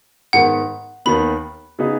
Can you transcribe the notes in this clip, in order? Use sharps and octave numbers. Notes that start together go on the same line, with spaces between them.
G#2 D#3 B3 F#5
D#2 D#3 B3 B5
C#3 B3 D#4 G#4